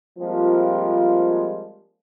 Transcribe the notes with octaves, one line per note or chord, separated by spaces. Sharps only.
F3 G3 G#3 A#3 C4 F4